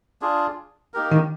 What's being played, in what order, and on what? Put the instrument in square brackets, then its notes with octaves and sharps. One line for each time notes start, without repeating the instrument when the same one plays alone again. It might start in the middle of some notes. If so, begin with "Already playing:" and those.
[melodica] D4 F4 G#4
A#3 D#4 G4 A#4
[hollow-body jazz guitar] D#3